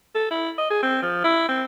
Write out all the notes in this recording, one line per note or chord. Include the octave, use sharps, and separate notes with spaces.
A4
E4
D#5
G#4
C4
F3
E4
C4